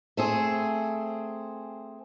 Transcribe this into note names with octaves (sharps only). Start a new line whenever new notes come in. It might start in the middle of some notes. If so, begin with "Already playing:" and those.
A3 C4 G#4